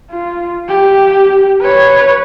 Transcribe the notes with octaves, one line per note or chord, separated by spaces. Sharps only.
F4
G4
B4 C#5